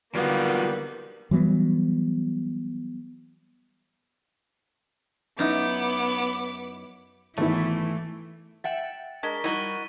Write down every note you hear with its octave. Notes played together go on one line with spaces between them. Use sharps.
D3 D#3 F#3 G3 A#3 B3 F4 F#4
E3 F#3 G3 B3
F#2 B3 D#4 E4 D6
G#1 E3 A3 B3 E4
E5 F#5 G5 A6 E7
G#3 D4 A#4 C#6 B6 G7
G3 D#4 E4 F#4 D#7 G7